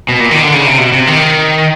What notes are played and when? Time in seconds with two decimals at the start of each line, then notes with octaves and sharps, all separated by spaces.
0.09 B2
0.20 A#2
0.31 D#3
0.43 D3
0.54 C#3
0.67 C3
0.78 B2
0.92 C3
1.07 D#3